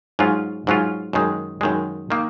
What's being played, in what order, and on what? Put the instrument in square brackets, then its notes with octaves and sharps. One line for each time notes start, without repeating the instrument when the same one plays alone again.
[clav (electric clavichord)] G#2 F#3 C#4 F4
G#2 F#3 C#4 F4
F#2 D#3 G#3
F#2 D#3 G#3
D#3 A#3